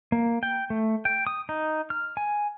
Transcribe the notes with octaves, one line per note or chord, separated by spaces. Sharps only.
A#3
G5
A3
G5
D#6
D#4
F6
G#5